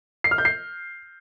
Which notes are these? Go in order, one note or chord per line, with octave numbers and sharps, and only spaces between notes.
C7
F6
G6
C7